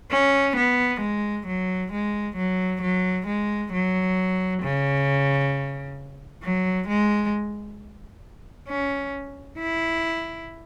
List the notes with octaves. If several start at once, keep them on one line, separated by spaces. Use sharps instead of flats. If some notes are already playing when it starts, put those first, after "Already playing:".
C#4
B3
G#3
F#3
G#3
F#3
F#3
G#3
F#3
C#3
F#3
G#3
C#4
E4